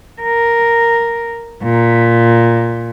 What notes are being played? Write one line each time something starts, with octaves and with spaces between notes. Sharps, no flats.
A#4
A#2